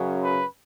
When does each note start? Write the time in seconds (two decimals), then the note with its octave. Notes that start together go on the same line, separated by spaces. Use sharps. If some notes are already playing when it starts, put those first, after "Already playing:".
Already playing: F#2 C#3 F#3
0.22 B4